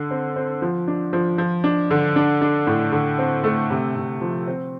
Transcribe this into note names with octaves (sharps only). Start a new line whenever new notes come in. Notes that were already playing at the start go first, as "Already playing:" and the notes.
Already playing: D3
C4
C4
F3
D4
F3
F3
D4
D3
D4
D4
A2
D3
C4
A3
C3
C3
F3
C4